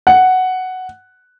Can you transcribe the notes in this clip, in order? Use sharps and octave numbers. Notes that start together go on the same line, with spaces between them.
F#5